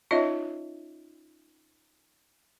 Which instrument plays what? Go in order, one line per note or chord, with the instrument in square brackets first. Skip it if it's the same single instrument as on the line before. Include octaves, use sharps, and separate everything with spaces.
[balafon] C#4 D#4 F4 C#5 D#5 E5